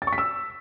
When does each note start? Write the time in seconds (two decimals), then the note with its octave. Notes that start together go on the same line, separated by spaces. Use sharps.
0.02 A6
0.07 C#6
0.13 B6
0.18 E6